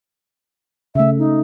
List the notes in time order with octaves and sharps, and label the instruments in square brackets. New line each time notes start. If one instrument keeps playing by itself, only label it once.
[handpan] C#3 A3 [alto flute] E5
[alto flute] D#4